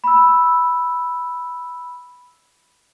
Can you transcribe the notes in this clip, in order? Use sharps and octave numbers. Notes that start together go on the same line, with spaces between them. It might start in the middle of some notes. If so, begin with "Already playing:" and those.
B5 E6